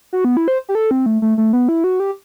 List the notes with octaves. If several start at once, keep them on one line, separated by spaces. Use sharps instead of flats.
F#4
B3
E4
C5
G4
A4
C4
A3
A3
A3
B3
E4
F#4
G4